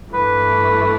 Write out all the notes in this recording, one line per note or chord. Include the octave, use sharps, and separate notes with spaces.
G2 E3 A3 B4